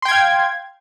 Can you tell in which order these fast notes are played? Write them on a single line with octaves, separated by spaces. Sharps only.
C6 G5 G#6 F5